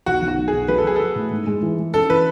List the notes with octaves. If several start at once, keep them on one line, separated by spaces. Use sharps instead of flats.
B1 F#4
B1
F#4
F#3
G#4
B1
F#3 B4
A4
F#3 G#4
F#3 A4
A2
G#2
G#3
E3
G#3
C#4 A4
E3 B4